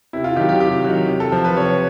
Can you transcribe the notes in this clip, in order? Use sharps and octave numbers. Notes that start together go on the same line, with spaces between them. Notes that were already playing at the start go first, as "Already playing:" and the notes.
C3 E4
F4
D#3 F#3 G4
G4
C3 G4
D#3 F#3
C3
A4
F3
B4
C3 C#5